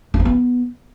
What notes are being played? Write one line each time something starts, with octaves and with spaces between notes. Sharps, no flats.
D4
C4
B3